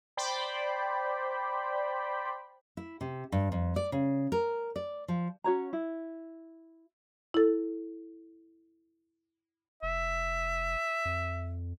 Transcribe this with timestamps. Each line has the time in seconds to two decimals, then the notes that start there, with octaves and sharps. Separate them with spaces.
0.17 C5 D5 G5 B5
2.77 E4
3.01 C3
3.32 G2
3.52 F2
3.76 D5
3.92 C#3
4.32 A#4
4.76 D5
5.08 F3
5.44 C#4 F#4 C#5 A#5
5.73 E4
7.34 E4 A4
9.83 F1 E5
11.05 F2